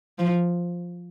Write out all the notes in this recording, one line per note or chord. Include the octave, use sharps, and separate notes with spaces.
F3